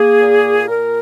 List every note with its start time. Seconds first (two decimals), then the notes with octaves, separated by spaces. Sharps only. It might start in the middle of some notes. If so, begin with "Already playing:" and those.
Already playing: A#3 G#4
0.20 A#2
0.67 A#2 A#4